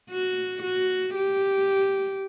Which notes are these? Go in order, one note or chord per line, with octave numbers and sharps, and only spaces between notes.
F#4
F#4
G4